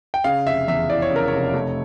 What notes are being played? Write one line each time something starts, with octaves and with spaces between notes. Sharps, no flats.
G5
C#3 F5
F1 E5
E2 E5
E3 D5
C#5
C#3
A#4
F1 C#5
A3